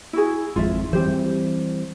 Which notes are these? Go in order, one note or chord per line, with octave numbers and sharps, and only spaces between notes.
E4 F#4 G#4
G#1 F2 G#2 F4 E5
E3 G3 C4 G4 C5